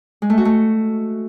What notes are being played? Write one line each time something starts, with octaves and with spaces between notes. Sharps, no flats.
G#3
A3
F#4
A3